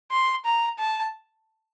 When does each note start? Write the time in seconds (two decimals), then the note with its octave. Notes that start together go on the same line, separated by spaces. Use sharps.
0.12 C6
0.45 A#5
0.79 A5